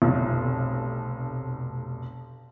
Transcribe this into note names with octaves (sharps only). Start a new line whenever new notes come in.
F1 B1